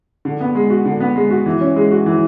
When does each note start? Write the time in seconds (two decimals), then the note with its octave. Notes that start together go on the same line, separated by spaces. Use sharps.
0.25 D3
0.41 B3
0.55 G#3
0.70 F#4
0.85 D3
1.00 B3
1.16 G#3
1.30 F#4
1.46 E3
1.61 C#4
1.76 G#3
1.91 F#4
2.06 E3